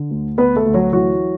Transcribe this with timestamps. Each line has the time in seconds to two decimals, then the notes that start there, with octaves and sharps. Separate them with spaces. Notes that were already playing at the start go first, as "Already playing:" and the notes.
Already playing: D3
0.11 D2
0.38 D2 B3 B4
0.56 A3 A4
0.66 D2
0.74 F#3 F#4
0.93 E3 F#3 F#4